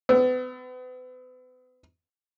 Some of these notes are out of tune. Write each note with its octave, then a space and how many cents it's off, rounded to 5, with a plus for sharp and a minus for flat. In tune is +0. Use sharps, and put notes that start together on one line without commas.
B3 +40 E6 +0